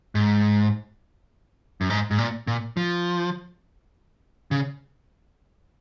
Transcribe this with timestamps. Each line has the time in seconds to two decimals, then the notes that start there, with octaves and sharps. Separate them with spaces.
0.15 G#2
1.81 F#2
1.90 G#2
2.11 G#2
2.18 A#2
2.47 A#2
2.77 F3
4.51 C#3